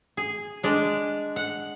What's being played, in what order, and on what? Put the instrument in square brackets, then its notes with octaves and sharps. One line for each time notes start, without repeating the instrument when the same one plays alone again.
[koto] G#4
G#3 D4
F#5